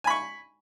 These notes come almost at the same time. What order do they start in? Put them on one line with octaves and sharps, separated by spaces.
G#5 B5 C#6